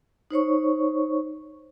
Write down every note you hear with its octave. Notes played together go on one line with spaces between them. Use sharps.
D#4 C5 C#5 C#6